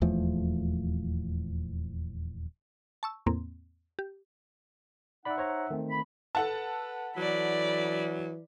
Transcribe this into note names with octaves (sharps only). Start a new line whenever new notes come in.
D#1 E2 F3 A3
A5 C#6 E6
E2 A2 A#3 C4
G4
D#4 D5 E5 F#5 B5
C5 C#5 A#5
D#3 A3 C4
B5
A4 B4 F#5 A5
E3 F#3 D5 B5